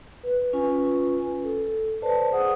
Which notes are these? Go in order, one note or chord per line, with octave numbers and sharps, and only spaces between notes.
B4
C#4 F4 B4 G#5
A4
B4 C5 D5 A5
G#4 C5 F#5 D#6